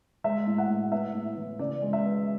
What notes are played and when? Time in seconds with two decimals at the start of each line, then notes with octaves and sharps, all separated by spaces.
0.24 G#3 E5
0.47 A2
0.58 F#5
0.70 A2
0.92 B3 E5
1.14 A2
1.37 E3
1.59 C#3 D5
1.82 G#3
1.93 E5
2.05 B3